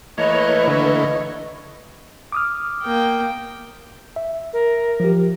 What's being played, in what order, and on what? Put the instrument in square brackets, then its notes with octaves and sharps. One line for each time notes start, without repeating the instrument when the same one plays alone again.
[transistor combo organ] E3 A3 A#3 [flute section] B4 [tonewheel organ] C#5 [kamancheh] D#5
[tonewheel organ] D3 [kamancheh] C#5 D#5
[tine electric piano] D6 D#6 F6
[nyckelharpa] A#3 G5
[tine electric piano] E5
[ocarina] A#4
[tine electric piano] F3 G4